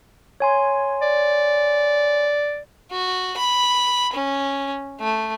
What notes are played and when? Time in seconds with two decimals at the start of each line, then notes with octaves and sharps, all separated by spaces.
0.40 C#5 G#5 C6
1.02 D5
2.91 F#4
3.37 B5
4.13 C#4
5.01 A3